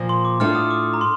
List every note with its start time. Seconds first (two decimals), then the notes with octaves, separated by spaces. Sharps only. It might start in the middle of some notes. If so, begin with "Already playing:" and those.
Already playing: A#2 F3 A#3
0.09 C6
0.25 D6
0.40 A2 A3 D4 F4 F6
0.55 D#6
0.70 D6
0.94 A#5
1.01 C6